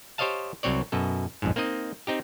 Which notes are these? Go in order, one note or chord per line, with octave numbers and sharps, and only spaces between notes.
G4 C5 C#5 D#5 F5 A5
C2 F#3 C4 C#5 D5
F#2 B2 A4
B1 F2 G#2
A#3 C4 D#4 D#5
C4 D#4 G4